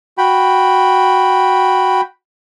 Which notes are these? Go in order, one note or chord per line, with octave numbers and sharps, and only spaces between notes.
F#4 G5 B5